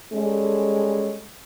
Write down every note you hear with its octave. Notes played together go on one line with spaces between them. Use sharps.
G3 G#3 C#4 A4